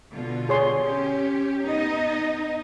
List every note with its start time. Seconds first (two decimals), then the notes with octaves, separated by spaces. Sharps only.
0.12 B2 D3 F4
0.49 G#4 C#5 C6
0.81 C#4 G4
1.63 B3 D#4 D#5